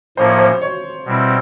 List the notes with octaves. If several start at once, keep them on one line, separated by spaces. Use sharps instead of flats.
A2 F3 A#3 C#4 E4 C5
C#5
C5
C#5
B2 G3 C4 E4